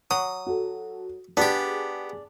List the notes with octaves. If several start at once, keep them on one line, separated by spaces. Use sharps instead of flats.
F#3 D#6
F#4 A4
B3 D4 G4 G#4